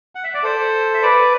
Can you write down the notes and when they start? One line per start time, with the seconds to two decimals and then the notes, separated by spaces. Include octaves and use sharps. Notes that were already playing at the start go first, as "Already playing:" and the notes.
0.15 F#5
0.24 E5
0.34 D5
0.43 A4 C5
0.94 E5
1.02 B4 D5